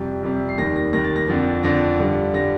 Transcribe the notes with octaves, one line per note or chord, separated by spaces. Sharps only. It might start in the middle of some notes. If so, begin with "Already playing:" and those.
Already playing: F2 C3 G3
F2 C3 G3
C7
D#2 D#3 G3 A#6
A#6
D#2 D#3 G3 A#6
A6
A#6
F2 D3 F3
F2 D3 F3 A#6
G2 D3 G3
D3 G3 A#6